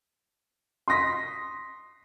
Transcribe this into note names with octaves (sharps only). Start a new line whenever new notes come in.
C6 D#6 A#6 B6